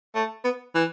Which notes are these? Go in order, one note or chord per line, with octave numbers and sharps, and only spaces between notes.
A3
B3
E3